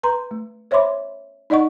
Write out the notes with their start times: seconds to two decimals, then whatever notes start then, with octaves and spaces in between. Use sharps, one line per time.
0.03 B4 A#5 C6
0.31 A3
0.71 C5 C#5 E5 B5 C6 D6
1.50 D#4 D5 D#5 F#5 C#6